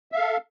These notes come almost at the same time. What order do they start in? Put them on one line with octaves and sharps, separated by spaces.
E5 F5 A4